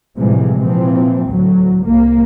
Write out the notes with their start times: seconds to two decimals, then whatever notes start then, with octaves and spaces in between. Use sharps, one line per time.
0.17 A2 C3 E3 F3 G3 G#3
0.58 A#2 E3 F3 C4
1.28 D2 A2 F#3
1.83 C2 A#3